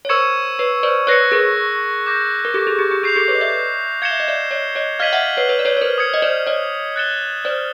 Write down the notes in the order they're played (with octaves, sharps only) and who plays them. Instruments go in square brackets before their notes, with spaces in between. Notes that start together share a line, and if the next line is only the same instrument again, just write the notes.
[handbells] C#5
[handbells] A#4 C5 [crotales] C#6 E6 G#6 C#7 E7
[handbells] B4 C#5
C5 D5
[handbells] B4 C#5 [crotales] F#6 A#6 C#7
[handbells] G#4 A#4
[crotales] D6 G6 A#6
[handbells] A#4
G4 A4
G#4
G4
G4
[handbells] G#4 [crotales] G6 C7 F7
[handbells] G4 A4
B4 C#5
D#5
D5 E5
[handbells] F5 [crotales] G#6 C#7 E7 G7
[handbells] E5
D#5
D5 E5
C#5 D#5
C#5 D#5
[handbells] D#5 F5 [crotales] F6 G#6 B6 D#7 F#7
[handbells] E5 F#5
B4 C#5
B4 C#5
D5
B4 C#5
C#5
A#4 C5
[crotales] D#6 G#6 C#7
[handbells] D#5
C5 D5
C#5 D#5
[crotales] F#6 A6 C#7 E7 G7
[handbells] C5 D5